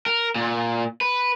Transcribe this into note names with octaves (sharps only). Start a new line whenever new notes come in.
A#4
A#2
B4